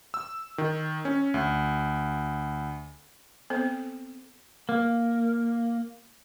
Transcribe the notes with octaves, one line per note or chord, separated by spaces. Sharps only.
E6
D#3
C#4
D2
B3 C4 A4 C5
A#3